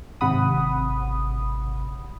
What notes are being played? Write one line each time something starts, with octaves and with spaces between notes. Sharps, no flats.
G#1 C3 F#5 B5 D#6